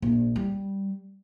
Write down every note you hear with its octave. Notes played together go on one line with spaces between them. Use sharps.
A#1
G3